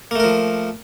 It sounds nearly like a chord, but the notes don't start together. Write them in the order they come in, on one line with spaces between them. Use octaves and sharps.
A#3 A3 A#4 F3